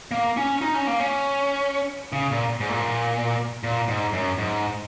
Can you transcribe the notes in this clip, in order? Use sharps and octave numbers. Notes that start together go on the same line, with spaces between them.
A#3
C#4
D#4
C#4
A#3
C#4
C#3
A#2
G#2
A#2
A#2
G#2
F#2
G#2